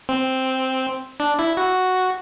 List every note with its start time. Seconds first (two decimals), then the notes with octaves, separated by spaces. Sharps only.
0.09 C4
1.20 D4
1.39 E4
1.57 F#4